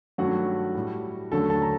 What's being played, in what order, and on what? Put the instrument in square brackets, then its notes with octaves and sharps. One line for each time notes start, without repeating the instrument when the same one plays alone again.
[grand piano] G2 D#3 F#3 A3 F#4 F#5
A2 G3
D#2 D3 F#3 A3 A4 A5
A4 A5
A#5